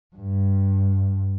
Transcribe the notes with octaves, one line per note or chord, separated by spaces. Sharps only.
G2